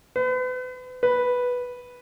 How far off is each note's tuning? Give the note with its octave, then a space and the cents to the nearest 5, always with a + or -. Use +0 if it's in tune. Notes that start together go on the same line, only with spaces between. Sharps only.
B4 +40
B4 -5